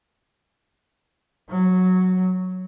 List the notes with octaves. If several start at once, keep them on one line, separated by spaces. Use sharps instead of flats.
F#3